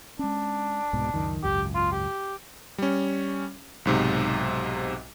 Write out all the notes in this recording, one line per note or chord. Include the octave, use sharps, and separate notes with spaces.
G#3 C#4 D4
C2 G#2 B2
C#2 F#2 D#3
G#1 C#2 F#2 G4
F4
G4
G3 C#4
B1 G#2 C3